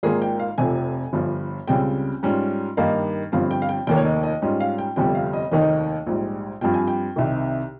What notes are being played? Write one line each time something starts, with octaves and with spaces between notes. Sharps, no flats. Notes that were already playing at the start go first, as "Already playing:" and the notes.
G#1 G#2 D#3 A#3 F4 G#4
G5
F5
F1 F2 C3 G#5
G1 G2 F3
C#2 C#3 G3 C4 G5
G#2 G3 C#4 F4
G2 D#3 A#3 D#4 F5
G1 G2 F3 C4 F5
G5
F5
G5
F1 D#2 D#3 A#3 G5
C#5
D#5
D#5
G#2 G3 C#4 F4 D#5
F5
G5
G1 F2 C3 G3 G5
F5
D#5
F1 D#2 D#3 A#3 D#4 D#5
A#1 G#2 G3
G2 F3 C4 F4 G5
G#5
G5
C2 C3 D#3